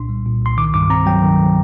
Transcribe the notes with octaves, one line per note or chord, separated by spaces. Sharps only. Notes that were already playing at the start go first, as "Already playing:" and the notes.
Already playing: C2 A#2 D4 C6
G3
A#2
C2 C6
D#3 D6
G2 D6
C4 A#5
F#3 G5
D#3